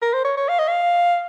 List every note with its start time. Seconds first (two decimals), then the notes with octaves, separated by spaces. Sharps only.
0.02 A#4
0.14 C5
0.25 C#5
0.37 C#5
0.48 F5
0.59 D#5
0.68 F5